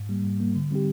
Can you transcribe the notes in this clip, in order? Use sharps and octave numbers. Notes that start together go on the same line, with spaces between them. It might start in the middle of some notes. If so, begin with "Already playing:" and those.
Already playing: G#2
G3 A#3
G#2
G3 A#3
D3
G3 C4 D#4 G4